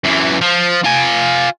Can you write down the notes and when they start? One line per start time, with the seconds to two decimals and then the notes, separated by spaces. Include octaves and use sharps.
0.04 F#2 E3
0.41 F3
0.84 F4 G#5